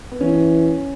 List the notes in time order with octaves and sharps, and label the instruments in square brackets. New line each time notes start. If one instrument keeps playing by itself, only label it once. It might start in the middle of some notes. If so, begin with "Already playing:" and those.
[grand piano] B3
[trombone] E3 [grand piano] C#4